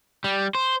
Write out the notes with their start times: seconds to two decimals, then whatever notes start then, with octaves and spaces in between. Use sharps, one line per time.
0.24 G3
0.55 C5